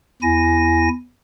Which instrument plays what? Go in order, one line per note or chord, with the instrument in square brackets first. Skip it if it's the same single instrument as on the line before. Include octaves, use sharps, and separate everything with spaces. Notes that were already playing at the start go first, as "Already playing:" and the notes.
[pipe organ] E2 E4 G#5 A#6